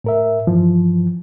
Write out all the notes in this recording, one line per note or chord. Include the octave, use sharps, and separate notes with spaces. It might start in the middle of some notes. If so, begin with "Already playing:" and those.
A2 A#4 E5
G2 E3 F3